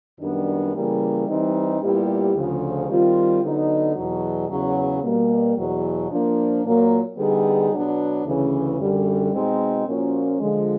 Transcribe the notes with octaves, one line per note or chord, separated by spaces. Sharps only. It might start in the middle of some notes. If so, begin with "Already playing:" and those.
F#2 D#3 G3 B3 D4
C#3 E3 G3 A#3
E3 G3 C4 D#4
A#2 G3 B3 E4 G4
D2 C#3 F3
D#3 G3 C4 F4
D3 F#3 B3 D#4
E2 B2 F#3
E2 C#3 F#3
B2 G3 A#3
E2 B2 F#3
F3 A#3 D4
A#2 F#3 A#3
D3 G3 B3 D#4 G#4
B2 F#3 B3 D4
D2 C#3 E3
F#2 D3 G3
B2 G#3 C4 D#4
A#2 F3 A#3 C#4 F#4
D3 F3 G#3